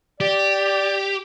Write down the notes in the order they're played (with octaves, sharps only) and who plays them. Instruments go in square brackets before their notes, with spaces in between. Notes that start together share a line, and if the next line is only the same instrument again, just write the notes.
[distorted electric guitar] G4 [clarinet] D5